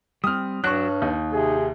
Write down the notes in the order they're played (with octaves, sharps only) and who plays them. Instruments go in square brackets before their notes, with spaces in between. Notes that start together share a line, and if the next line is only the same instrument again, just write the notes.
[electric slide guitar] G3 C4 [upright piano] D#6 F6
[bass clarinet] G2 [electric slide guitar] F#3 D4 F#4 [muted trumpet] C#5 [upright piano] C#6 F#6
[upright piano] D#2 [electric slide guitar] D#4
[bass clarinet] C3 [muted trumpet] G#4